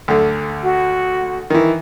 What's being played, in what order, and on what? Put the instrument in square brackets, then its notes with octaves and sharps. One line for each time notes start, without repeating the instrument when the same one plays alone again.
[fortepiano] D2 D3
[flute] F#4
[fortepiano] D#3 E3